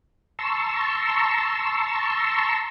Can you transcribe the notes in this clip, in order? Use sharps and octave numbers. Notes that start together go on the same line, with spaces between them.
A5 A#5 C6 C#6 E6